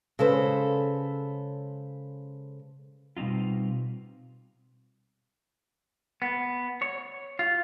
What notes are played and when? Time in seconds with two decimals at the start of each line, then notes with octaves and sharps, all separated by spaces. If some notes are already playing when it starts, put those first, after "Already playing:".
0.19 C#3 G#3 A4 B4 C5
3.17 B2 G3 C4 D#4 F4
6.22 B3
6.82 C#5
7.39 F4